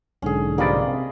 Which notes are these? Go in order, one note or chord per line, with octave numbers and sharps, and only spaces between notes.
B1 G#2 D3 C#4 G#4
A#1 G2 C3 A#3 D5 D#5 B5